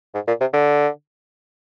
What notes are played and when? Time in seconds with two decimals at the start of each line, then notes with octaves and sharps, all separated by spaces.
0.14 G#2
0.28 A#2
0.40 C3
0.53 D3